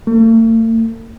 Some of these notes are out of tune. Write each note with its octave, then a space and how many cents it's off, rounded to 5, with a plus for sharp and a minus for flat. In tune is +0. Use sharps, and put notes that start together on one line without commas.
A3 +45